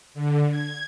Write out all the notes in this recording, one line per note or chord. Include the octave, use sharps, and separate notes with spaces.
D3
G#6